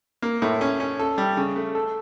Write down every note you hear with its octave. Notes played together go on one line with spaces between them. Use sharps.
A#3
A2
C#4
C#4
A4
G3
C#3
A3
A4